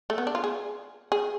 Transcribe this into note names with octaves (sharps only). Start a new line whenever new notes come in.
A3
B3
D4
F4
G#4
G#4